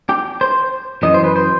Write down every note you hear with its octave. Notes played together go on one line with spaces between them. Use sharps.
G4
C5
F#2 E3 D#5
C5
B4
C5